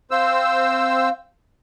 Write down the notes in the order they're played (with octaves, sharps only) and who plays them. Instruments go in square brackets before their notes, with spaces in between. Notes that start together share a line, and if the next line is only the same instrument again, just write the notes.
[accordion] C4 C5 E6 [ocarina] F5